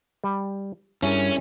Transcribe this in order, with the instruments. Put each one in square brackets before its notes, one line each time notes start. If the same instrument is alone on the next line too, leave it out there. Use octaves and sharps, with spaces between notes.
[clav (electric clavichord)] G3
[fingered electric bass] G2 [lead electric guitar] C#4 [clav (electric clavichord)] E4 G#4 A#4